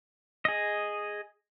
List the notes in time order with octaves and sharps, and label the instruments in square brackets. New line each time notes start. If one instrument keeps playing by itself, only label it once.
[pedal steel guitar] G#4 D#5